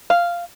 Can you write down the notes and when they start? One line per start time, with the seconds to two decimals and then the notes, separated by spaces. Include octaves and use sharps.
0.10 F5